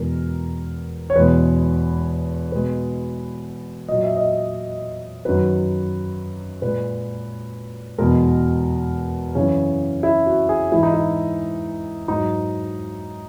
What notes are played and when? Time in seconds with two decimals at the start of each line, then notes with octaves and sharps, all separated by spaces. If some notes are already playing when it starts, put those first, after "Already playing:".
Already playing: E2 B2 G#3 A#4
1.10 C#5
1.16 E2 B2 G#3 B4
2.52 B2 G#3 B4
3.88 A#2 F#3 D#5
4.03 E5
4.17 D#5
5.25 F#2 D#3 F#3 B4
6.62 A#2 G#3 B4
7.98 E2 B2 G#3 A#4
9.35 F#2 C#3 E3 C#4
10.03 E4
10.26 F#4
10.49 G#4
10.72 G#2 E3 G#3 E4
10.83 D#4
10.94 E4
12.08 G#2 F#3 D#4